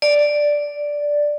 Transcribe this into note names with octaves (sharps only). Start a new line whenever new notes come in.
D5